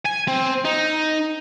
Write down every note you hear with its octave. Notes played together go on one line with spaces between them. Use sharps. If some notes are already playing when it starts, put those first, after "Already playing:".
G#5
C4
D#4